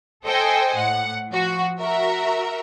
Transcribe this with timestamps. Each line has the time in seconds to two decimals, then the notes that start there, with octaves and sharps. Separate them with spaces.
0.24 A4 C5 D#5 G5 G#5
0.77 A2 F#5
1.31 F3 F#4
1.79 F#4 A#4 E5